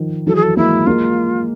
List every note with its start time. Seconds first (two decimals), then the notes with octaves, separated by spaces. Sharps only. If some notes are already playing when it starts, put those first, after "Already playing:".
Already playing: D#3 F3
0.27 E3 F#3 A4
0.35 G#4
0.43 A4
0.57 G#3 A#3 E4
0.87 G#3 A#3 F4